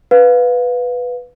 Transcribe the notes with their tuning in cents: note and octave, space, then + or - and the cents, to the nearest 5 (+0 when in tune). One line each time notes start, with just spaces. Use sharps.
B4 +0 F5 +20